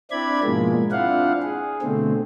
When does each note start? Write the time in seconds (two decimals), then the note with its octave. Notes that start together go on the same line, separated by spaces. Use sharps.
0.11 C4 D4 E4 D5 B5 G#6
0.44 G#2 B2 F3 G#3 A#3
0.92 C4 D4 E4 F4 F5 F#5
1.43 G#4
1.82 B2 D3 A3 C4